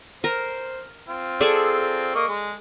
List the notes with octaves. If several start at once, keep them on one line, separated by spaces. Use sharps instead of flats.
A#4 C5
C4 F4
G#4 A4 D5
A#3 D#5 C#6
G#3